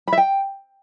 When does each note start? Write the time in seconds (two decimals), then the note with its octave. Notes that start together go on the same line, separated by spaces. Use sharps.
0.08 B5
0.13 E5
0.18 G5